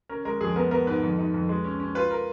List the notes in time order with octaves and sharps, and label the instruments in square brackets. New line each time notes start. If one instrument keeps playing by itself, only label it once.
[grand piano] C#4 A#4
G#3 A#4
F2 G#4
B3 A#4
B3 A#4
G#2 B4
F2
D#4
F2
G#3
C#4
C#4
F4 B4
A#4